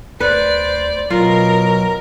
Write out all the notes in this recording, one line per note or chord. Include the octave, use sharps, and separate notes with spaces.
D2 B4 C5 D5
B2 F#3 F4 A#4